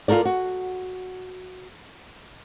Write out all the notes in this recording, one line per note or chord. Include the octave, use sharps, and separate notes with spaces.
F4 G4 A4 A#4 D5
F#4